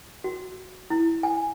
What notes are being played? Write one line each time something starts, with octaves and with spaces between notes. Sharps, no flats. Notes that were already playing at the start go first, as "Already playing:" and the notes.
F#4
E4
G#5